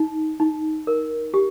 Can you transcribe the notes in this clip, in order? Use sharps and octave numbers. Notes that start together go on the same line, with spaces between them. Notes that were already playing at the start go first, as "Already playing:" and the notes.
Already playing: D#4
D#4
A#4
G4